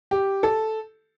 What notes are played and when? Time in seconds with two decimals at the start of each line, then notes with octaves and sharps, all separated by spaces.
0.11 G4
0.43 A4